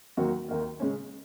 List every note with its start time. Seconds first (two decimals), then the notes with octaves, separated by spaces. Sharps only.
0.17 D#2 D#3 F#3 A#3 F#4
0.48 D#2 D#3 A#3
0.80 C#3 G#3 C#4